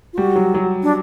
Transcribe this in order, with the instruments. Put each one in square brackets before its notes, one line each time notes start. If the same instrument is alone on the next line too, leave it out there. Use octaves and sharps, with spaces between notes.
[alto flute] F4
[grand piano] G3 [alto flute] F#4
[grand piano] F#3
F#3
[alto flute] D4